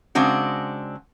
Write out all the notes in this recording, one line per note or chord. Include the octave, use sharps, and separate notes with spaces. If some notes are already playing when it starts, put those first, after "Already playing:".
C#3 G#3 C4 D4 F#4